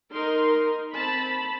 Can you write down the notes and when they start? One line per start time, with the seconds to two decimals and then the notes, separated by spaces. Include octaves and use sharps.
0.13 D#4 A#4 C6
0.95 C4 A5 B5